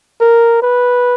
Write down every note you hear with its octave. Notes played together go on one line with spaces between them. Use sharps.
A#4
B4